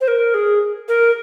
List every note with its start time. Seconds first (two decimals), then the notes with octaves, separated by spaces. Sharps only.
0.01 C5
0.08 A#4
0.34 G#4
0.88 A#4